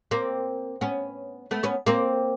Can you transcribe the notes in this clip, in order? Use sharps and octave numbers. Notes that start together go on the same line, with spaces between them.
A#3 C4
B3 C#4
A3 B3
B3 C#4
A#3 C4